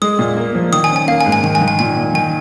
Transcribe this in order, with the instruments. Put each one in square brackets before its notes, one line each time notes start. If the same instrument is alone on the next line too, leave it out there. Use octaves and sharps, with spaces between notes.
[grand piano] G#3 [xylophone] D#6
[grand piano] A#2
A#3
F3
[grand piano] D#3 [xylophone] D#6
[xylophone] G#5
[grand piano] C#4
[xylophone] G#5
[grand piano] A#3 [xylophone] F5
[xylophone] G#5
[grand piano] G#2
[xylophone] G#5
[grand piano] D#3 [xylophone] G#5
[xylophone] G#5
[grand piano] D#3
[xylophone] G#5
[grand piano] A#2 [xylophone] G#5
[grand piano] A#2
[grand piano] D#3 [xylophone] G#5